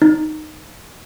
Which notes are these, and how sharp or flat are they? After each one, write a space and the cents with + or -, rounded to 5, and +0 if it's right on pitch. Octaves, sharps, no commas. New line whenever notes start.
D#4 -10